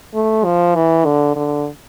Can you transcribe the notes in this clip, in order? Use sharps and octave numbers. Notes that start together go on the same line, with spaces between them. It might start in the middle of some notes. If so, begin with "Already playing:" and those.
A3
F3
E3
D3
D3